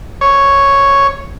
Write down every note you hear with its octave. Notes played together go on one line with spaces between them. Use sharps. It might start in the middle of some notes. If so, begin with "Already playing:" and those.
C#5